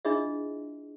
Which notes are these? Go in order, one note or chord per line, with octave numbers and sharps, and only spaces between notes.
D4 E4 F4 G#4 D#5 E5